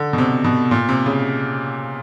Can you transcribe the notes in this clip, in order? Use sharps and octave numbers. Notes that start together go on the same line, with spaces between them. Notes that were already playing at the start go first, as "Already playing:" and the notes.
Already playing: D3
B2
C3
B2
A#2
C3
C#3